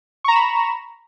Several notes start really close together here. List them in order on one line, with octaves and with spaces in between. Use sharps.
C#6 A#5 E7 B5